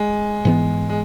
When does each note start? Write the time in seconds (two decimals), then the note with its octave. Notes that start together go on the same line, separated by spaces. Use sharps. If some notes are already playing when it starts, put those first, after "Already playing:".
Already playing: G#3
0.45 G#2 E3 B3
0.89 G#3